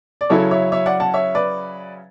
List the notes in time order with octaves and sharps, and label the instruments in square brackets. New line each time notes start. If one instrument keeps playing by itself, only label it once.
[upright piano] D5
C#3 F#3 C#4 E4 A4 C#5
C#5 E5
C#5 E5
D5 F#5
F#5 A5
C#5 E5
B4 D5